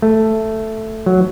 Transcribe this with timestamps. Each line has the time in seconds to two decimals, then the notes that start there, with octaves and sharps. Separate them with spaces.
0.02 A3
1.06 F#3